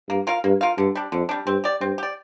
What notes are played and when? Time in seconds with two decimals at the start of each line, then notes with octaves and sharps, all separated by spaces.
0.09 G2 A#3
0.27 F4 A#4 F5
0.44 G2 A#3
0.61 F4 A#4 F5
0.78 G2 D3
0.95 G3 D4
1.12 F2 D3
1.29 G3 D4
1.47 G2 C4
1.64 G4 D5
1.81 G2 C4
1.98 G4 D5